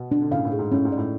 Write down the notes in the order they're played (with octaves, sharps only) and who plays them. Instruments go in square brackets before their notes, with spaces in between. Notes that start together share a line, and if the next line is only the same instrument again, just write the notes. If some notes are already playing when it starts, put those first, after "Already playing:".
Already playing: [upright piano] B2
[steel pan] D4
[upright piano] D3
[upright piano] A2 C#3 [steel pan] F5
[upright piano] A2
[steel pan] G#4
[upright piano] G#2
[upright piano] A2 [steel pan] C#4
[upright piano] G#2
[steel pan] D5
[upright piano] A2